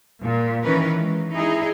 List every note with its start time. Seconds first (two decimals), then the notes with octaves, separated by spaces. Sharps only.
0.20 A#2
0.62 D#3 E3 C#4 A#4 B4
0.97 G#3
1.31 D#4 E4 G#4